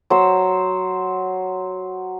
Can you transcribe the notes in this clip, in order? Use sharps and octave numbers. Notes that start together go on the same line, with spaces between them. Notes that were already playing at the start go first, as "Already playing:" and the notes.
F#3 C5 E6